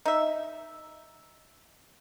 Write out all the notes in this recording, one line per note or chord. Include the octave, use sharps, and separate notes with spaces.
D#4 E5